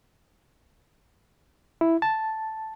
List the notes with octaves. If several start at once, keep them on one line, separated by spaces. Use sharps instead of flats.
E4
A5